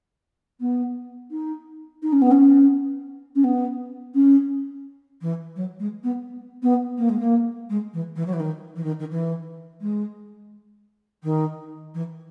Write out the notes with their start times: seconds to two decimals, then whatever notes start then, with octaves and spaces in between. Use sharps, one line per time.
0.60 B3
1.31 D#4
2.02 D#4
2.12 C#4
2.21 B3
2.31 C#4
3.35 C#4
3.44 B3
4.14 C#4
5.21 E3
5.56 F#3
5.79 G#3
6.03 B3
6.62 B3
6.98 A#3
7.09 G#3
7.19 A#3
7.69 G#3
7.93 E3
8.15 E3
8.26 F#3
8.33 E3
8.40 D#3
8.76 E3
8.83 D#3
8.99 D#3
9.11 E3
9.81 G#3
11.23 D#3
11.94 E3